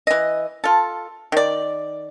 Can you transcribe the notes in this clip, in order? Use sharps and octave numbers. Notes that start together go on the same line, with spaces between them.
E3 D#5
F4 A4
D#3 D5